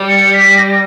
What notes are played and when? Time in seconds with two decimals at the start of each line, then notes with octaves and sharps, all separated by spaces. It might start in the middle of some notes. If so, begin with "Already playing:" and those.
Already playing: G3
0.08 C#7
0.33 B6
0.57 A#6